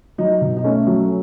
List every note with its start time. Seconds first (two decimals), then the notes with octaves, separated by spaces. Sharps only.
0.18 F#3 D#4
0.41 B2
0.57 D#4
0.64 A3 C#4
0.87 F#3